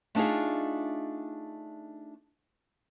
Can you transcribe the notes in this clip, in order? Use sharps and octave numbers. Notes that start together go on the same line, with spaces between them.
A3 D4 D#4 F4 G#4